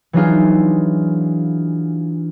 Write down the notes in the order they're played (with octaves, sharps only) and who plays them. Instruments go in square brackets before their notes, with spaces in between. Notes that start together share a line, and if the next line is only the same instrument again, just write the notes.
[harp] E3 F#3 D4 D#4 F4 G#4